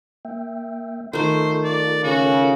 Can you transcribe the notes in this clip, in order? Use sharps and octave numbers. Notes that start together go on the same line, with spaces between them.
A#3 E5 G5
D#3 A3 F4 A4 A#4 C5
D5
C#3 F#4